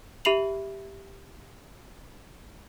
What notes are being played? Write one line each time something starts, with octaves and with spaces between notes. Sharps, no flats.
G4 E5 B5 C7 F7 F#7